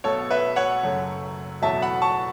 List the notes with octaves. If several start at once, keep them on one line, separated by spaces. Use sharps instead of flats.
B1 B2 A3 A4 C#5
B4 E5
C#5 F#5
F#1 F#2 F#3 A3
E2 B2 F#3 A3 E5 A5
F#5 B5
A5 C#6